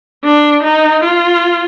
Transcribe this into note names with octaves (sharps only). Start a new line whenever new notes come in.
D4
D#4
F4